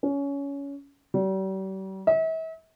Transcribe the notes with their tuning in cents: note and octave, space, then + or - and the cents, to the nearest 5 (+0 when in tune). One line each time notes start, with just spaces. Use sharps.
C#4 +20
G3 -40
E5 -40